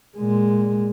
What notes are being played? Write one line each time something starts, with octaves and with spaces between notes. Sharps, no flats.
A#2 G#3